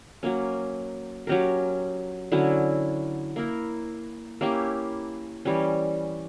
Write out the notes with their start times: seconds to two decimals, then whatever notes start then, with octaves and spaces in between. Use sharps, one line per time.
0.23 F#3 A#3 C#4
1.27 F#3 C#4 G4 A#4
2.32 D3 F#3 C#4 E4
3.36 A#3 E4 A#4
4.41 A#3 C#4 E4 G4
5.45 E3 G3 C#4